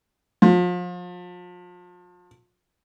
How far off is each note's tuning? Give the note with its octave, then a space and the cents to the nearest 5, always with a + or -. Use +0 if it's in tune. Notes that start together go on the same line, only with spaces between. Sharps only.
F3 +35